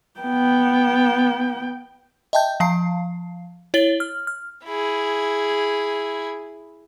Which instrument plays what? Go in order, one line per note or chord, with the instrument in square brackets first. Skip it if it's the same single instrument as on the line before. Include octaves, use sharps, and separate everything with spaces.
[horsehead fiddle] B3 G5
[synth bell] D#5 E5 G5 A5 G6
F3 F5 A5 C7
E4 C#5 A6 F#7 G7
F6
F6
[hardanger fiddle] E4 G#4